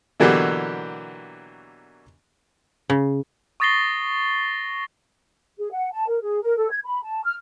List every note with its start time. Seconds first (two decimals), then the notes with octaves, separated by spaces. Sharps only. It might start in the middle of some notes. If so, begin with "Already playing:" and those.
0.20 B2 D3 E3 F#3 A#3 G4
2.90 C#3
3.60 C#6 D#6 A6 A#6 C7 G7
5.59 G#4
5.72 F#5
5.92 A5
6.08 A#4
6.22 G#4
6.42 A#4
6.57 A4
6.70 G#6
6.84 B5
7.03 A5
7.24 F6